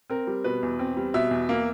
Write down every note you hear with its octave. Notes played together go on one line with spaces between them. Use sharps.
C4 A#4
G3
B2 B4
E2
C4
G3
B2 E5
E2
A#3